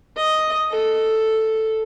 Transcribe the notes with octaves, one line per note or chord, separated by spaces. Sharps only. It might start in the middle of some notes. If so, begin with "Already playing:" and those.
D#5
A4